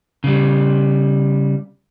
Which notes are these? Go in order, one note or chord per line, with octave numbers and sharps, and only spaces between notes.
C#3 G3